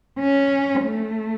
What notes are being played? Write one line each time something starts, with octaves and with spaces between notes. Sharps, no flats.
C#4
A3